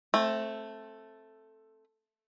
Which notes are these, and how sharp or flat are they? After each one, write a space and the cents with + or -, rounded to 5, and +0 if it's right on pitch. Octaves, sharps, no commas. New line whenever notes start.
A3 +0 C4 +20